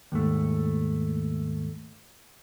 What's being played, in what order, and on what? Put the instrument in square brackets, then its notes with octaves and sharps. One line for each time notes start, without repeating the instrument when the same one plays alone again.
[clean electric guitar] D#2 G#2 A3